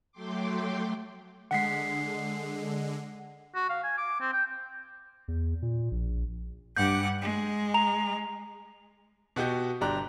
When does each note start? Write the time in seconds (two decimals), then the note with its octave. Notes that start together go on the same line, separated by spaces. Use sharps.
0.12 F#3 A3 G5 C6 D6
1.51 D3 G#3 F#5 B6 C7
3.55 F#4
3.69 F5
3.84 G#5
3.98 D6
4.20 C4
4.33 G5
5.28 E2
5.62 A#2
5.91 A#1
6.76 G2 F#5 G6
7.22 G#3
7.74 A#5 F7
9.36 B2 F#4 G4 G6
9.81 G1 D4 G4 A#5 F#6